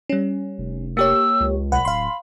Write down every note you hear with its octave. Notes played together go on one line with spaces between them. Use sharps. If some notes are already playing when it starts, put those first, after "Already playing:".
G3 C#4
F1
A#3 G4 C#5 E6
C#2
B1 F#5 B5
D1 F5 C6